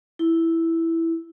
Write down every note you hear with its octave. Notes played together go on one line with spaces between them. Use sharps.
E4